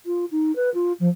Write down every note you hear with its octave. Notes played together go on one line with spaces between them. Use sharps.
F4
D#4
B4
F4
F3